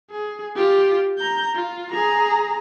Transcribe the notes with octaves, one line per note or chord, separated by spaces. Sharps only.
G#4
F4 G4
A#5 G6
F4
G#4 A#5